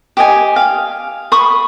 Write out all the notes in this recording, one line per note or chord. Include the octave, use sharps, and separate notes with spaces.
G4 D#5 G#5
F5
B5 C#6 D#6